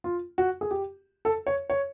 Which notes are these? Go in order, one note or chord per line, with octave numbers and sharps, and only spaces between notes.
F4
F#4
G#4
G4
A4
C#5
C#5